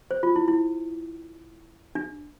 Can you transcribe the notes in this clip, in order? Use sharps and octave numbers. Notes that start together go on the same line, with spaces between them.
C5
F4
E4
E4
D4